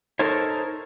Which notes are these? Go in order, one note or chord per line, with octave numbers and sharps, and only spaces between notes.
D#4 A4 A#4 C5 C#5